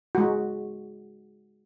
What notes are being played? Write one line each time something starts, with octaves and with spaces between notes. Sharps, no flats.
G#3 F#4